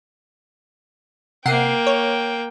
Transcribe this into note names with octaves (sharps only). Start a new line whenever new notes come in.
C3 A#3 F#5 G5 C7
C#5